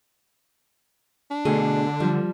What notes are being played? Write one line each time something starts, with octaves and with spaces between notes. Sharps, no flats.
D4
B2 D3 A3 G#4
F3 G3